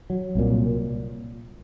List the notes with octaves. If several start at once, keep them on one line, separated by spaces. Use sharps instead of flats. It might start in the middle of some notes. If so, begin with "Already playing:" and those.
F#3
C2 A#2